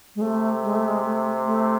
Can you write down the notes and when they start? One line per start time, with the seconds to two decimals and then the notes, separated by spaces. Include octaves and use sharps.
0.16 G#3
0.21 C3 A3
0.63 G#3
0.75 A3
0.87 G#3
1.04 A3
1.46 A3